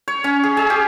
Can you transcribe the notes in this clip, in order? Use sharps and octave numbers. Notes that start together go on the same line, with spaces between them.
C#5
C#4
G#4
G#4
G4